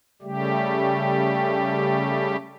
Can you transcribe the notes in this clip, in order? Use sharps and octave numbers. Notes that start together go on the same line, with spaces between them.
C#3 G3 A3 G4